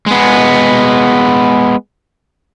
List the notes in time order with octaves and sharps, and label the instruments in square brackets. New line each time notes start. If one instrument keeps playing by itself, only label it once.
[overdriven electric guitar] G#3 B3